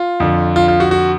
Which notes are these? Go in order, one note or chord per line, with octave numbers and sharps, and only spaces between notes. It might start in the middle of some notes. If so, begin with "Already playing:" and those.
Already playing: F4
F2 D3
F4
F4
F#4
F#4